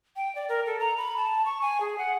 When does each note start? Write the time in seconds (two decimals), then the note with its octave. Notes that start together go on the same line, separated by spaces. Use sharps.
0.16 G5
0.35 D5
0.49 A#4
0.66 A4
0.79 A#5
0.97 B5
1.17 A5
1.45 C#6
1.61 G#5
1.80 G#4
1.98 F#5